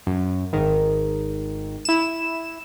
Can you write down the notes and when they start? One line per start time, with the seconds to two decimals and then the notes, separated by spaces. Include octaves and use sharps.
0.07 F#2
0.53 G#1 D#3
1.85 E4 E7